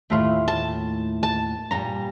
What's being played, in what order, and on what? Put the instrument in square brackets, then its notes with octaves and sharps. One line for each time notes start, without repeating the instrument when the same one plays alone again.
[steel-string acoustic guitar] D#2 A2 [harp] A3 E4 F4
[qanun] A5
A5
[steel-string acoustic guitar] G2 A#2 G3 [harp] A#5